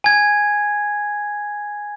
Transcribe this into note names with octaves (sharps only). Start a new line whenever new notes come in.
G#5 G#6